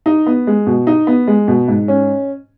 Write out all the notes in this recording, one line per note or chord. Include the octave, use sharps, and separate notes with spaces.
D#4
B3
G#3
B2
D#4
B3
G#3
B2
G#2
C#4